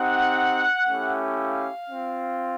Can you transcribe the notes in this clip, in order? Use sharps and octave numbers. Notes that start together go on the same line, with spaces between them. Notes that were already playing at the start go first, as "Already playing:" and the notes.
Already playing: C4 D#4 G4 F#5
A3 C#4 E4 G4
F5
C4 F4